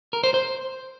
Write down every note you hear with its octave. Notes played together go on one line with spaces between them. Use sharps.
A#4
C5
C5